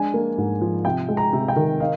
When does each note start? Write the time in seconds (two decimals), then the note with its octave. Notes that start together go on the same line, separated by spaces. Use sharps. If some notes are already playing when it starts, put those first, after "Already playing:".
Already playing: G#3 D4 G#5
0.14 A#3
0.38 G#2
0.61 F3
0.85 C3 G5
1.08 G#3
1.17 A#5
1.33 C3
1.48 G5
1.56 D#3
1.80 D#4 F5